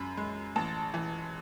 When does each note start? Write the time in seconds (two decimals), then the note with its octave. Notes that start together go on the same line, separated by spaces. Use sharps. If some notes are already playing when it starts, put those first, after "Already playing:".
Already playing: F#2 G#3 B5
0.17 G#3
0.56 A1 A5
0.94 E3